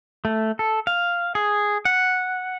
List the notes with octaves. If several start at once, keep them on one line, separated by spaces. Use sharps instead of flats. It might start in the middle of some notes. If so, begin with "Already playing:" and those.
A3
A4
F5
G#4
F#5